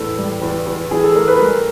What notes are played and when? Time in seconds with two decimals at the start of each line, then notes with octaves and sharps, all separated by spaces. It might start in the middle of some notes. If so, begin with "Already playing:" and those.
Already playing: E2 A2 A4
0.18 G3
0.42 E2
0.66 E2
0.91 E3 G#4
1.03 A4
1.15 A3 A#4
1.28 B4
1.40 G3 A#4